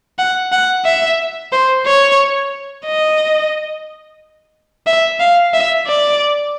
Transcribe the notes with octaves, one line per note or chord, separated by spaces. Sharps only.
F#5
F#5
E5
C5
C#5
D#5
E5
F5
E5
D5